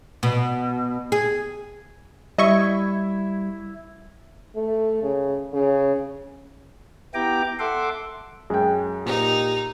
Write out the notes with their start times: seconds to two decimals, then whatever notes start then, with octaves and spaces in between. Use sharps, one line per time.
0.23 B2
1.12 G#4
2.38 G3 E4 D#5 E5 C#6
4.56 A3
5.03 C#3
5.53 C#3
7.14 B3 E4 G4 G5 A#5 D6
7.59 A4 E5 F#5 C6 D6
8.50 F#2 G#3 G5
9.06 A#2 D#4 G4